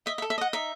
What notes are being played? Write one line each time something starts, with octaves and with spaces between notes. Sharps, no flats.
D#5 E5
E5
A4
E5
D#5 F#5
D#4 E5